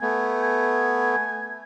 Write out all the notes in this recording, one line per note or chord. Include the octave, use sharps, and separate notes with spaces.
A3 B3 G#5
G#5